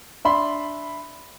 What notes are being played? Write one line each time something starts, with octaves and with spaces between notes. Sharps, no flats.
D4 E5 B5 C6